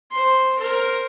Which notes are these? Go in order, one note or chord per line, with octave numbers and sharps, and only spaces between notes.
C5 C6
A#4 C5